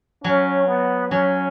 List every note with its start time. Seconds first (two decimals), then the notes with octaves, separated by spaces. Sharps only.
0.24 F#3 C#4
0.67 B3
1.11 F#3 C#4